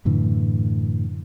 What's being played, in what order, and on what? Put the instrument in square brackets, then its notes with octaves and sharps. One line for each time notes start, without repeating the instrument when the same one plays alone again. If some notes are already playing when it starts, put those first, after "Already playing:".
[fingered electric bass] F#2 A2 D3 E3